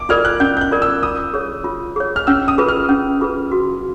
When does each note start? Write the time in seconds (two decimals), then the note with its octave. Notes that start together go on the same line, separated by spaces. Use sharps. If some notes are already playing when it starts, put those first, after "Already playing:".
Already playing: D6
0.09 F4 A#4 D5 F6
0.25 F#6
0.40 C#4 G6
0.57 G6
0.61 F#6
0.71 F4 A#4 D5
0.82 E6
1.03 F4 D#6
1.34 G#4 C#5
1.64 F4
1.96 G#4 C#5
2.16 F6
2.27 C#4 E6
2.48 D#6
2.58 F4 G#4 B4
2.68 F6
2.89 C#4
3.21 F4 G#4 B4
3.52 F#4